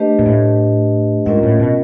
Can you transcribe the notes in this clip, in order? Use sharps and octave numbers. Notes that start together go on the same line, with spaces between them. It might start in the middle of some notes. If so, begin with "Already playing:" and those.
Already playing: A3 D4 G4 B4 D#5
A#2
A2
G#2 C#4 F4 A#4 D#5 F#5
A2
B2